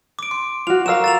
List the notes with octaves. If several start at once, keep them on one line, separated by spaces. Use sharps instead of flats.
D6 D7
C6
F4 F#4 F7
F#4 A#4 F5 A#5 E6 E7
A6 E7 F7